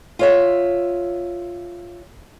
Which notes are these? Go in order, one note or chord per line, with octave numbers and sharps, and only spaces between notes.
F4 C#5 E5